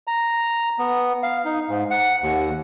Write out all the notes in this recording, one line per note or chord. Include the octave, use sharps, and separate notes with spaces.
A#5
B3
F5
D#4
G#2
F#5
D#2